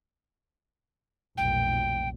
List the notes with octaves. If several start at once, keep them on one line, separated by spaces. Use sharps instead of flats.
F1 B1 A#2 G5